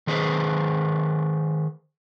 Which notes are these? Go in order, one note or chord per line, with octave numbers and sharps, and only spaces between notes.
D#3 G#4 B4 C5